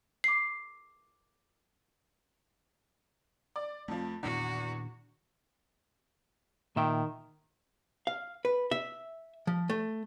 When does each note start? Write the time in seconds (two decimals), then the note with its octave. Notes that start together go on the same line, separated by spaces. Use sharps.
0.24 D6 C7
3.56 D5
3.88 F2 F3 A3
4.23 E2 A#2 D#3 D4 F#4
6.76 A#2 D#3 E5 G5
8.07 F5
8.45 B4
8.71 E5
9.47 F3
9.70 A3